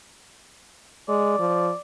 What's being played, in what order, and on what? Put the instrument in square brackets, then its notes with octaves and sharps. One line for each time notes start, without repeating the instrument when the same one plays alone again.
[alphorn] G#3 [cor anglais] D5
[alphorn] F3